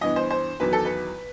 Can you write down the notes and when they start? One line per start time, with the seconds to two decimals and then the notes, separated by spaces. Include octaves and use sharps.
0.01 G2 E3 B3 D#5
0.16 C5
0.30 C5
0.60 E2 D#3 F#3 B3 B4
0.73 A4
0.85 B4